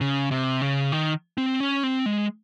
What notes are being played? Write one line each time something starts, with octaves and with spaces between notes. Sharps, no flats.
C#3
C3
C#3
D#3
C4
C#4
C4
G#3